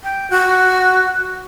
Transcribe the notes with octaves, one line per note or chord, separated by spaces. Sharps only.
G5
F#4